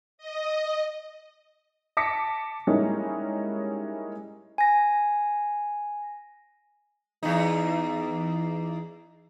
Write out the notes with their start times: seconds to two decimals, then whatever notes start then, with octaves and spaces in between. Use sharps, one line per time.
0.18 D#5
1.97 A5 D6 A#6 B6 C#7
2.67 G3 G#3 A#3 C#4 D#4 E4
4.58 G#5 A#6
7.23 E2 D#4